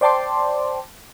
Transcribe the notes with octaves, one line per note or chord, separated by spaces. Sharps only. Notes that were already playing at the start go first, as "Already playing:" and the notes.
C5 D5 G5 A5 C6 D6